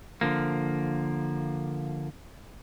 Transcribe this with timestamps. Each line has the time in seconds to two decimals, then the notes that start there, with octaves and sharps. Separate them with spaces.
0.21 D3 F3 A#3